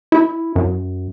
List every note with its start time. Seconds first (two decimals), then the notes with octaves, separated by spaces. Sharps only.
0.12 E4
0.56 F#2